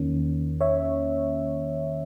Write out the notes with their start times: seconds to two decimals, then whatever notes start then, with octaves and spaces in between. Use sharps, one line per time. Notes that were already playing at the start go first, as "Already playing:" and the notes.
Already playing: E2 D#3 A#3 C#4
0.61 C#5 E5